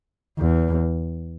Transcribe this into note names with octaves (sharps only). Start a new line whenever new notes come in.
E2